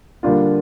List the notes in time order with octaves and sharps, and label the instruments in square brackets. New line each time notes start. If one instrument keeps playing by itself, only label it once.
[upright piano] D3 G3 A#3 D4 F4